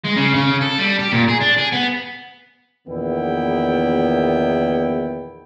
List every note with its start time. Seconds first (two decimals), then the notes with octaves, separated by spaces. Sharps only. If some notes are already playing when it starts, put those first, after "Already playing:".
0.04 G#3
0.16 C#3
0.34 C#3
0.61 A4
0.79 G3
0.99 G4
1.12 A#2
1.28 G#4
1.41 D4
1.58 G#4
1.72 B3
2.88 A#1 E2 D#3 B3 E4 G5